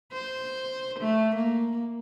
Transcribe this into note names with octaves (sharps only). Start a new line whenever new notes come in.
C5
A3
A#3